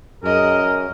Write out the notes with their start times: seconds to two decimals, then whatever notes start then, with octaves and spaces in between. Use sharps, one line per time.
0.24 F#2 G#4 A#4 D#5